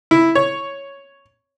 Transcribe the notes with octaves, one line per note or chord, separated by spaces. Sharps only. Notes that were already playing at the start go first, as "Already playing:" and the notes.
E4
C#5